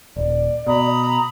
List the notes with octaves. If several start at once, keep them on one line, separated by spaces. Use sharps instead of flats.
D#1 D5
B2 A#5 B5 D#6